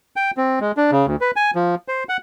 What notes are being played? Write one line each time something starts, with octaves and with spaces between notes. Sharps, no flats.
G5
C4
G#3
D4
C#3
D2
B4
G#5
F3
C5
F#5